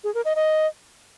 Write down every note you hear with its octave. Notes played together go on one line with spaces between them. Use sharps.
G#4
A#4
D#5
D#5